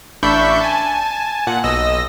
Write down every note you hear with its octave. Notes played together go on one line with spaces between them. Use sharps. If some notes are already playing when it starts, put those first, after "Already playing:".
A1 D4 E5 B5 C#6 G6
G#5 A5
A#2 F#5
B1 D#5 E6 A#6